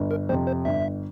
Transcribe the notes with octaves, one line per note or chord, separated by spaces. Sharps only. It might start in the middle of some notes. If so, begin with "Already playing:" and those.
Already playing: G1
A#4
F2 C3 C5
C5
G1 E5